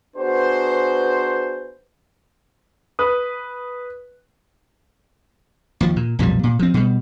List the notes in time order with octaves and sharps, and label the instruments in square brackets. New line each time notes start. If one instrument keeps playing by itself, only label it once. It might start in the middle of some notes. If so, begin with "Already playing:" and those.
[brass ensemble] B3 D4 F#4 G#4 B4 C5
[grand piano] B4 D#6
[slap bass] D#2 F3
A#2
B1 F2 A#2 G3
A#2
F3 C4
B2 G3